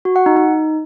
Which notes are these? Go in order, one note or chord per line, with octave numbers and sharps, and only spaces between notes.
F#4
F#5
D#4
D#4